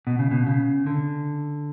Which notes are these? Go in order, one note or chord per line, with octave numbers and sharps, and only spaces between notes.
B2
C#3
B2
C#3
D3